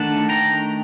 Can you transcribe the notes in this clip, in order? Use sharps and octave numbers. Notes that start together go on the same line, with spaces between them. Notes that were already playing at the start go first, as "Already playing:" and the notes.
Already playing: D#3 A3 D4 F#5 A5
G5 A#5